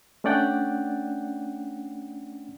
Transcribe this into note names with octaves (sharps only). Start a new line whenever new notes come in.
A3 C#4 D4 D5 F#5 G5